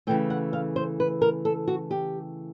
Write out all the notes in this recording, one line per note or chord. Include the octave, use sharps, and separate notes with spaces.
C#3 E3 A3 G5
F#5
F5
C5
B4
A#4
A4
F#4
G4